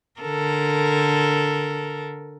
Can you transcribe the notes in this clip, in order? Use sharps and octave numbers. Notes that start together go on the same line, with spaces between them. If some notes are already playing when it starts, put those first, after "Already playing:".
D3 A4 A#4